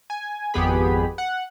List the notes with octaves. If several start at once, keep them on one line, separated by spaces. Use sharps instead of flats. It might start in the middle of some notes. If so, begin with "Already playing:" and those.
G#5
G#1 F2 B3 G4 G#4 B5
F#5